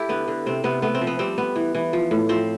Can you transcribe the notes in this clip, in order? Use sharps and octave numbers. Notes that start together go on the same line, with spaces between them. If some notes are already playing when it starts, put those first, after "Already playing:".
Already playing: E4 G4 A4
D3 B3
D3
C3 C4
C3 B3
A3 B3
C4
F3
B3
G3 C4
B3
E3
E3
F3
A2
F3 C4